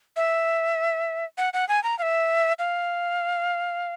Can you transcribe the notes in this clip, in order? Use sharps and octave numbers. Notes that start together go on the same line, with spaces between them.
E5
F#5
F#5
G#5
A#5
F5
E5
F5